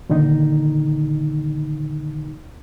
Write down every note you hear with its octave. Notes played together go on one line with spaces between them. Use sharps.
A#2 D3 D#3 D#4